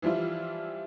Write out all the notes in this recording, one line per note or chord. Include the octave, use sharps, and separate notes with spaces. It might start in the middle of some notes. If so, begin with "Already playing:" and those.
E3 F3 G3 E4 F4